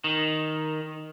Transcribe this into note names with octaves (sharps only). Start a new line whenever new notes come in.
D#3